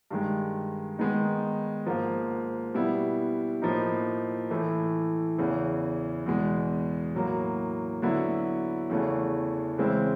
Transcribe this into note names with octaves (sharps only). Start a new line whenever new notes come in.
G2 D#3 G#3
D#3 G#3 B3 D#4
G#2 F3 A#3
B2 G3 B3 E4
A2 F3 A#3 D#4
A2 E3 A3
E2 C#3 E3
E2 B2 G#3
A2 F#3 A#3
D3 F#3 B3 E4
E2 C#3 E3 A3
C#3 E3 G#3 C4 E4